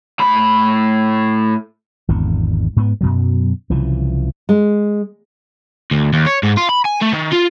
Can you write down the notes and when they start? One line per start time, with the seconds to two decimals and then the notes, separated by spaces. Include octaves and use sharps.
0.19 A2 B5
2.08 G#1 E2 D3
2.76 G#2 B3
3.01 F#2 B2 F#3
3.70 C2 C#3 E3 F3
4.49 G#3
5.91 D2
6.13 D#2
6.26 C#5
6.43 G#2
6.57 F4
6.69 B5
6.85 G#5
7.02 A3
7.14 D#3
7.33 F4